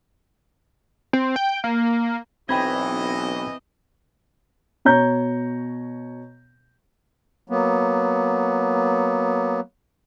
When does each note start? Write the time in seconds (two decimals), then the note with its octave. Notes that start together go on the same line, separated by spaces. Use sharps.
1.13 C4
1.36 G5
1.64 A#3
2.49 B1 E3 C4 D#5 G5 B5 G#6
4.85 B2 C#5 A#5 G6
7.49 F#3 A#3 B3